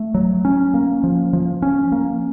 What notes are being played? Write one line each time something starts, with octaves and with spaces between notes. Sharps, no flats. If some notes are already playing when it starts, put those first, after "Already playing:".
Already playing: A3
F#3
C#4
A#3
F3
F3
C#4
A#3